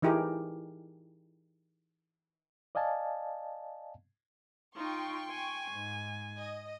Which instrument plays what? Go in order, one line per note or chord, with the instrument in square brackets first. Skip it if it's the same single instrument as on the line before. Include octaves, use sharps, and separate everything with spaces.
[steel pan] E3 D#4 E4 G4 G#4 A#4
[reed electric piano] D5 D#5 F5 G#5 A5
[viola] D#4 F4 [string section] G5 C6 C#6
[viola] G#5
[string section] G#2
D#5